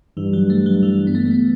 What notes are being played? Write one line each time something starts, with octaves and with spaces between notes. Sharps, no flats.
G2 E3
F#3
A3
F#3
E3
B3
A3
A3
B3